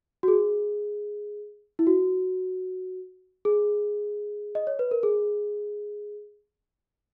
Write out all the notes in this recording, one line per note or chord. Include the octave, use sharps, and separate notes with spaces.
F#4
G#4
E4
F#4
G#4
D#5
C#5
B4
A#4
G#4